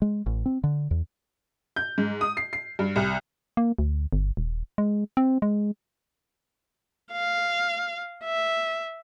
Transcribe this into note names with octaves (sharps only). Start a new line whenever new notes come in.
G#3
A1
C4
D3
E2
G6
G#2
D#6
C7
C7
G2
C2
A#3
D2
G1
D#1
G#3
C4
G#3
F5
E5